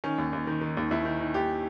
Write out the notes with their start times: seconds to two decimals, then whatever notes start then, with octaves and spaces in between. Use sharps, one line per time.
0.04 D#3 C#4
0.18 D#2
0.33 D#2
0.47 D#3
0.61 D#3
0.77 D#2
0.91 D#2 E4
1.05 D#3
1.20 D#3
1.34 D#2 G4